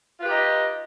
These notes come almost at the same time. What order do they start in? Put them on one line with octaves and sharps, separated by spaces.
F4 B4 G4 D#4 D#5